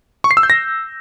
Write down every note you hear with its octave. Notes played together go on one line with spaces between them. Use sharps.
C#6
C7
E6
G6
A#6